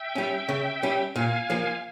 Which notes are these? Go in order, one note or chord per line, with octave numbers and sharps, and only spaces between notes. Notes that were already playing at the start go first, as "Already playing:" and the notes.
Already playing: E5 G5
G3 C#4
C#3
G3 C#4
A#2 F5 G#5
F3 A#3